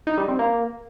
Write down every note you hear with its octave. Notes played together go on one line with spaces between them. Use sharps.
D#4
G3
C4
A#3